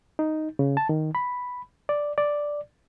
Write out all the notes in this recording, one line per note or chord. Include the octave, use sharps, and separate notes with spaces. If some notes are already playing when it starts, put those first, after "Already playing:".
D#4
C#3
A5
D#3
B5
D5
D5